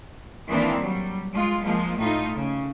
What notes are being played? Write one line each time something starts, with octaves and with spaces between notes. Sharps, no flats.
D#3 E3 G#3 A#3 C4 D4
F#3 G3
G#3 F4
F3 G#3 A#3
A2 A3 D#4 F4
C#3